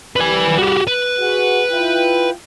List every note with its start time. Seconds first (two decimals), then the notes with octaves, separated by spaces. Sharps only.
0.16 C2 G3 B4 G#5
0.58 F#4 G4
0.87 B4
1.19 F#4 G#4 F#5
1.70 E4 F4 G5